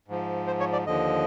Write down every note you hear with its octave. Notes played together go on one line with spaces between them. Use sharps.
G#2 F3
C5
C#5
D5
D#2 D3 F3 D#5